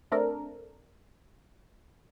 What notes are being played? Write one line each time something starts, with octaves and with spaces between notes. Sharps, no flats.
A3 C4 D4 A4 A#4